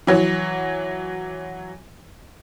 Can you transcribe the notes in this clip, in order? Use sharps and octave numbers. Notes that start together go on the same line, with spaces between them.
E3 F#3 C#5